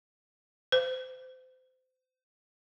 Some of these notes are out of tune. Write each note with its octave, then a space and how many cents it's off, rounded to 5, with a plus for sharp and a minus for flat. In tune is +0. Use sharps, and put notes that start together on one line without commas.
C5 -30